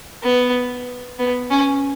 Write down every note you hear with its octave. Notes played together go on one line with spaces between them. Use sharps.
B3
B3
C#4